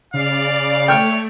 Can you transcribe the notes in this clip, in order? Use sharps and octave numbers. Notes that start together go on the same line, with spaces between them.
C#3 D5 F5
A3 C#5 G5 F6